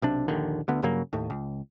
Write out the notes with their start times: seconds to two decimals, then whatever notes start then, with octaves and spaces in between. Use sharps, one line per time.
0.02 B1 C3 D4
0.28 A#1 D#2 D3 D#3
0.68 D2 D3 B3
0.83 G2 C#3 F#3 A#3
1.13 D#2 A2
1.30 C#2